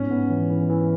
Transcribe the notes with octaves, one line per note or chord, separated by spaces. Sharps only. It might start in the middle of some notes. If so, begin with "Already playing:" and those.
Already playing: G#2 B3 C#4
B3
E3
E3
E3